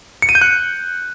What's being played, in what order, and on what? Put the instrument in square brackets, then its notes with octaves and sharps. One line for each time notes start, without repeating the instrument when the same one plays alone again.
[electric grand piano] C#7
D#7
G6
F#6